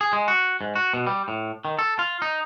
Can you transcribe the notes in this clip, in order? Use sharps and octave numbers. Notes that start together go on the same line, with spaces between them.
G#4
G#3
F#4
G#2
F#4
B2
G3
A2
D#3
A4
F4
D#4